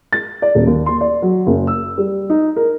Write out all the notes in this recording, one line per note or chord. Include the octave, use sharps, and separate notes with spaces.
A6
D5
D#1
D#2
C6
D5
F#3
F#1
E6
G3
D#4
A#4